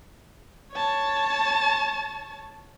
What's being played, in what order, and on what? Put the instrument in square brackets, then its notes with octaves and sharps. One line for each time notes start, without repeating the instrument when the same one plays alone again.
[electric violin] C#5 A5